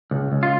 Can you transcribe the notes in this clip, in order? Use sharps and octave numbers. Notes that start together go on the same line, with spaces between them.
C#2
C#2
F4